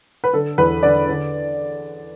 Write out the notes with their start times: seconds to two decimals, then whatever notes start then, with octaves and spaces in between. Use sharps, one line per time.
0.24 B4
0.33 D3 A4
0.58 E2 B4
0.83 D3 D5
1.09 D3